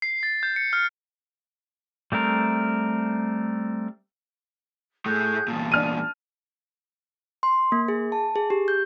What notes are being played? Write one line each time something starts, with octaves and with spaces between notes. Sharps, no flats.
C7
A6
G6
C#7
F6
G3 A3 C4 A#4
A2 A3 G#4 F#6 G6
E2 A#2 A5
D4 F6 D#7
C6
A#3
G#4
A5
G#4
G4
G6